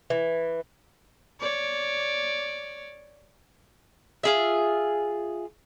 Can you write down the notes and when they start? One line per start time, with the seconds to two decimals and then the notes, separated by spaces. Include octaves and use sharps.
0.10 E3
1.40 C#5 D5
4.23 F4 G#4 E5